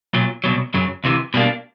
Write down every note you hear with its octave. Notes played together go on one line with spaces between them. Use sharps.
B1 A#2 F#3
C2 B2 F#3
F#2 C#3 F#3
C#2 C3 E3
B2 G3 A#3 D4